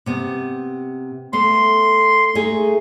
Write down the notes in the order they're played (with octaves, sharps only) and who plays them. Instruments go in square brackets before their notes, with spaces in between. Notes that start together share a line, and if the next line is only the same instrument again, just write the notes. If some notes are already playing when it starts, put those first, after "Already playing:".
[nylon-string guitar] C3 B3
[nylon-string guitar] A3 B3 [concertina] C6
[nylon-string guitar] A3 D#4 G#4